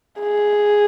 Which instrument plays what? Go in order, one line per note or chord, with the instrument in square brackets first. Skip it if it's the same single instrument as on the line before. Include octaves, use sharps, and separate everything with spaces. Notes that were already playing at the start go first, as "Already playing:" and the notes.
[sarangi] G#4